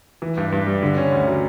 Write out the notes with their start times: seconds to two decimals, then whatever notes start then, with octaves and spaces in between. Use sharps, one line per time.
0.22 E3
0.37 G2
0.52 G2
0.67 G3
0.82 D3
0.98 C#4
1.12 D2
1.28 F#3